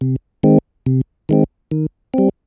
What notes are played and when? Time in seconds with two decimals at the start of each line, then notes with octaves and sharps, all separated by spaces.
0.01 C3
0.43 D#3 G#3 C4
0.86 C3
1.29 D#3 G#3 C4
1.71 D#3
2.14 G3 C4